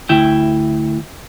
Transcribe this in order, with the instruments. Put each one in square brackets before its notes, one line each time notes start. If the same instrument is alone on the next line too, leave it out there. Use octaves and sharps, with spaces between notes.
[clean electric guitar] D2 E4 G5